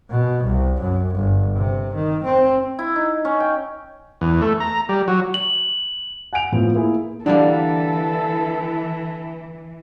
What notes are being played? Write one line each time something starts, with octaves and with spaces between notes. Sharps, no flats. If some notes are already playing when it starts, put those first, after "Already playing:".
B2
C2
F#2
G1
C3
D#3
C4
E4
D#4
C#4
G5
E2
A3
A#5
G3
F#3
F#7
F#5 G#5 G6 D7 F7
A2 F3 B3
A#3 E4 G#4
D3 E3 G3 A#3 D4 A4